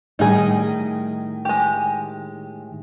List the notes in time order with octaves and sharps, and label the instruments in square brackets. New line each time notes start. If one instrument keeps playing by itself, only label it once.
[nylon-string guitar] A2 D#3 G3 [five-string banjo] D#4 G#4
[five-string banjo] G#3 G4